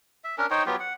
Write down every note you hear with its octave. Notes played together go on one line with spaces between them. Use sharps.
E5
C#4 D4 A#4
D#4 C5 C#5 G5
F#3 B3 F4 G4
F#5